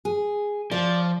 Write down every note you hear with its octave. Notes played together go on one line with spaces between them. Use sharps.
G#4
F3 D5